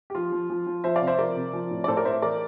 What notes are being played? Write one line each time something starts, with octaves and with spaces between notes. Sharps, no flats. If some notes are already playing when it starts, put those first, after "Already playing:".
G4
F3 F4
F3
F3
F3
F3 C5 E5
D5 F5
C3
C5 E5
F3 A#4 D5
C3
F3
A2
D5
A2 A4 C5
A#4 D5
A2 C5 E5
E3 A#4 D5